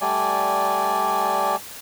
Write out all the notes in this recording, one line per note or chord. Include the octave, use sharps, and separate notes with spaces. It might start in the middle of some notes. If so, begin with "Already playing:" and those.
G3 A3 D5 G#5